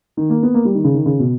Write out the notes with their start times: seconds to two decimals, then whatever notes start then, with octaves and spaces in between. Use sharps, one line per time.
0.17 D#3
0.30 A#3
0.43 B3
0.54 A#3
0.65 G3
0.75 D#3
0.84 C#3
0.94 D#3
1.06 C#3
1.19 B2